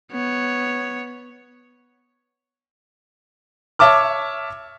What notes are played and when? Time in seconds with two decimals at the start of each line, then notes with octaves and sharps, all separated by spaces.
0.12 B3 C#5
3.79 C#5 E5 A5 D6 F6